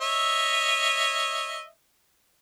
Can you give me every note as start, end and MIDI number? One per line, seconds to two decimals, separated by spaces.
0.01 1.65 73
0.01 1.65 75
0.01 1.65 76